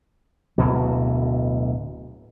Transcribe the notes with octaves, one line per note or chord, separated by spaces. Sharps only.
D1 D2 B2 F#3